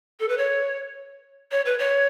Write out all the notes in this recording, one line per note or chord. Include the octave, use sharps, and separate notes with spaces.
A4
B4
C#5
C#5
B4
C#5